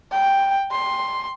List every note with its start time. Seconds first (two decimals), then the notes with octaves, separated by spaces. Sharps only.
0.12 G5
0.72 C6